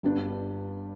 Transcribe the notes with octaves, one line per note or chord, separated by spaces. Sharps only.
G1 G2 G3 D4 G4